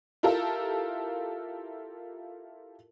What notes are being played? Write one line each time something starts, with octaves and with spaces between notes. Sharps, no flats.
E4 F4 G4 A4 A#4 F5